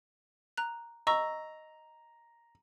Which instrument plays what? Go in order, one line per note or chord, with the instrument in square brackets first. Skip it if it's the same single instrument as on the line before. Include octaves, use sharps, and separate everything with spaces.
[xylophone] A#5 F#6
[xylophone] D#5 C#6 E6 [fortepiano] A#5